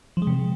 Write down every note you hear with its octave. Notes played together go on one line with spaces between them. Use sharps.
F3
G#3
C3